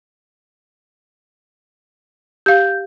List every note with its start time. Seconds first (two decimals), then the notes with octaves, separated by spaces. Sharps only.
2.46 G4 F5 G6